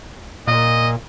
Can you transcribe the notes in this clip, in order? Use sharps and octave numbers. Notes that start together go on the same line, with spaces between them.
A#2 D#5